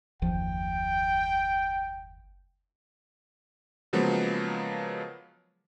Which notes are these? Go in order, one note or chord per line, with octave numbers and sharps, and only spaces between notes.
F#1 D#2 F3 G5
C#3 F3 F#3 G#3 A#3 B3